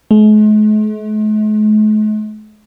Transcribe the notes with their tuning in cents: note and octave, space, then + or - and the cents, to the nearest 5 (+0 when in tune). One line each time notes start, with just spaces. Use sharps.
G#3 +45